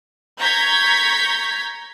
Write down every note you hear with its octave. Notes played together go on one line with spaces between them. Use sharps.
A#5 C#6 G6 G#6 B6